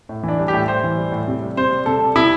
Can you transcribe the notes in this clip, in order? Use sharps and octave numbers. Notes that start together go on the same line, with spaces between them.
A2
E3
D4
G3
G4
A2
A2 C5
E3
G3
A2
C3
G3
C3 C5
G3
C3 A4
G3
C3 E4